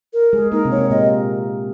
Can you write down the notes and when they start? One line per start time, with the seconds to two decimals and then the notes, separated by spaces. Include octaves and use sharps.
0.13 A#4
0.33 G#3 G#4
0.52 A#3 D#4 A#4
0.65 C3 C4
0.71 C#5
0.78 C3 C4
0.90 A#2 A#3 D#5